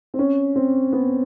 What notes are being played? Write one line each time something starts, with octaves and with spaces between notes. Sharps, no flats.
C4
C#4
C4
B3